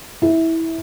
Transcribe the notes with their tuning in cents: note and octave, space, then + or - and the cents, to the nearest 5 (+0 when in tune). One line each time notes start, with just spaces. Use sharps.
E4 -15